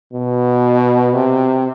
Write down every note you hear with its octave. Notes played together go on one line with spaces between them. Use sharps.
B2
C3